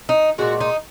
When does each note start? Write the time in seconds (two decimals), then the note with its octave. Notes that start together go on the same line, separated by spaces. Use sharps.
0.09 D#4
0.38 A#2 G#3 F#4
0.61 D#4